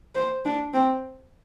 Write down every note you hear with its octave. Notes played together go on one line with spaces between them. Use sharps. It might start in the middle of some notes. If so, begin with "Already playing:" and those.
C5
D4
C4